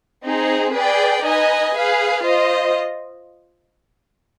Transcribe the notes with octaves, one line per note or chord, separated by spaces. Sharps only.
C4 D#4 G#4
G#4 B4 D5 G5
D#4 B4 D#5 G#5
G#4 B4 F5
F4 C5 D#5